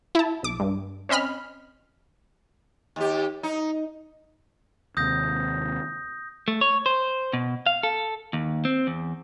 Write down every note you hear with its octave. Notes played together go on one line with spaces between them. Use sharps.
E4 A5
B1 D6
G2
C4 C#4 D#5 B5 F6
D#2 G4
D#4
D#2 C3 D#6 G6 A#6
A3
C#5
C5
B2
F5
A4
D#2
C4
E2